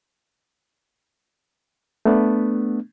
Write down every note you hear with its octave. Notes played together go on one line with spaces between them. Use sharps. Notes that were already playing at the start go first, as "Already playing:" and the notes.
A3 B3 D4